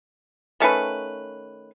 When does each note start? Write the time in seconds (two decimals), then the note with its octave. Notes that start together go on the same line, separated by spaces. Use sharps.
0.60 D#3 A3 C#4 B4